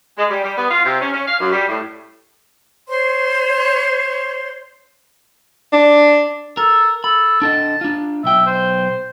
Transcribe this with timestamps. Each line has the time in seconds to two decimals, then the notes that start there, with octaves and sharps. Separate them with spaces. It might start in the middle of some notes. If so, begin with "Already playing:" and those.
0.18 G#3
0.30 G3
0.44 G3
0.58 B3
0.71 F4
0.85 C3
1.01 C#4
1.14 C#4
1.27 F5
1.40 F#2
1.52 G3
1.69 A2
2.87 C5 C#5 C6
5.73 D4
6.57 A4 A#4
7.04 A4 B5
7.42 D4 A4 D#5 A5
7.81 D4 F4
8.24 B1 E5 G5
8.46 C5